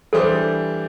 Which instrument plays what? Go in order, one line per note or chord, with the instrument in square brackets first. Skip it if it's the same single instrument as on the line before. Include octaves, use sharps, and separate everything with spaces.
[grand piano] E3 G3 D4 G4 C5 [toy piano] A4